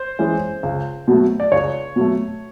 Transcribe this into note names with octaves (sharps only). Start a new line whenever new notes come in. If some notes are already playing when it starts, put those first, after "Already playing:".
Already playing: C5
E3 G#3 C#4
C#2
B2 F#3 A3
D5
C#2 C#5
B2 F#3 A3